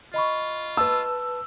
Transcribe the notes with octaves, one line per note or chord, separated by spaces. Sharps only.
F4 D#5 B5 C#6
B4 A5 E6